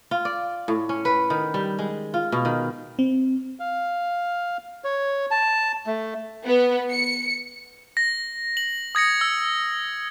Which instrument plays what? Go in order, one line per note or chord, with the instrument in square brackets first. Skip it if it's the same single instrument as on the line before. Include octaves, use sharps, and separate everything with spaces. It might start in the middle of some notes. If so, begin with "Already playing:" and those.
[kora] F4
D5
A2
C#4
B4
D#3
G3
G#3
F4
B2
D#3
[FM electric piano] C4
[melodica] F5
C#5
A5
A3
[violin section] B3
C#7
[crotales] A#6
F#7
D#6 G#6 A#6 C#7
E6